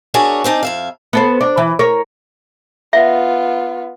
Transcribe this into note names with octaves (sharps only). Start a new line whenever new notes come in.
D4 F#4 G#4 A#4 C#5 E5
C4 D4 D#4 A5
F2 E5 F5
B3 A4 C5
D4
E3
A#4 C#5
B3 F4 E5